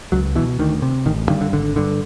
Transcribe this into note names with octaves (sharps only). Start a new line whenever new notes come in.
C#2 F#3
B2 E3
D2 D#3
C3
A1 D#3
G2 D3 D#3
D3
G#1 D3
G2 D3